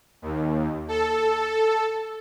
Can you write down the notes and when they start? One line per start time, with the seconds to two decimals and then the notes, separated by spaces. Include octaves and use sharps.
0.22 D#2
0.88 A4